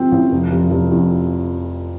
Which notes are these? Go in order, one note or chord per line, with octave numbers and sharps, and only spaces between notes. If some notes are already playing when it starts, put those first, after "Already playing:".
Already playing: F3 C4
A1
F1
F1
F1
F2